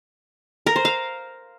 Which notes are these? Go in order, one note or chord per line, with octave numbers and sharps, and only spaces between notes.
A#4
C5
F5